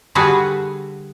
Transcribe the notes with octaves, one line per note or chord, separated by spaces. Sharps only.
D3 G3 F#4 G#4 B4